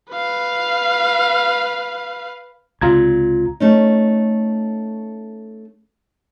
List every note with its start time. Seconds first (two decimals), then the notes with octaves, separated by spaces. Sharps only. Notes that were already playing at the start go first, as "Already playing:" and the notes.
0.13 B4 F5
2.81 C#2 C3 F4 A#5 G#6
3.60 A3 C#4 D#4